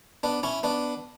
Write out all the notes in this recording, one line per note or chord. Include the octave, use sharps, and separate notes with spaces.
B3 D4
C#4 E4
B3 D4